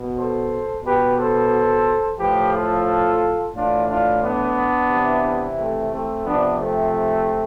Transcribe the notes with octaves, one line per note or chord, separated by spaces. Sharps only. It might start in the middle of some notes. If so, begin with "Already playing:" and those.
Already playing: B2
A4 C5
B2 G4 B4
A4 C5
A2 F3 G4 B4
F4 A4
A2 E3 D4 F4
D4 F4
B3 D4
C3 E3
A3 C4
A3 C4
C3 F3 B3 D4
A3 C4